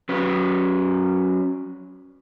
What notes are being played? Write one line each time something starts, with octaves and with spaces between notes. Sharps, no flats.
F#3 C#4 B4